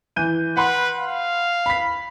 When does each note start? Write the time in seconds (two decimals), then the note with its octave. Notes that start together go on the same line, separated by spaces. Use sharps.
0.16 E3 G6 D#7
0.57 B4 F#5 B5 C6
0.99 F5
1.66 B5 B6